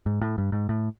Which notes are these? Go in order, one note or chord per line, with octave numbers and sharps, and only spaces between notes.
G#2
A2
G2
G#2
A2